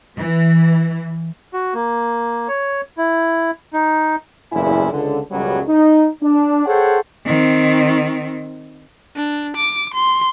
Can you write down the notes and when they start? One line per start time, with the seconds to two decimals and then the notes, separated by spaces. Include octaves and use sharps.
0.19 E3
1.53 F#4
1.74 A#3
2.48 C#5
2.98 E4
3.73 D#4
4.53 F#1 E2 G2 A#2 E4 G#5
4.92 C#2 D3
5.31 C#2 F#2 B2 F#3 G3
5.68 D#4
6.22 D4
6.66 G#4 A4 C5 C#5 F#5 G5
7.26 D#3 C4
9.16 D4
9.57 D6
9.94 C6